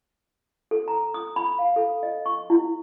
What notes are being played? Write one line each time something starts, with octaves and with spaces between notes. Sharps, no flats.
A4
A#5
D#6
B5
F5
A4
D#5
C#6
E4